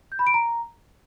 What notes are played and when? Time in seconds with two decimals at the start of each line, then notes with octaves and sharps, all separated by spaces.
0.12 G6
0.19 B5
0.27 D7
0.34 A#5